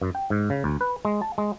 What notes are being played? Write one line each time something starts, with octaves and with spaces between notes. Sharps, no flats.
F#2
G5
G#2
C#3
D2
B4
G#3
A5
G#3